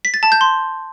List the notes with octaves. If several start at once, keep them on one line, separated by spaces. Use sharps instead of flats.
B6
A6
A5
G6
C6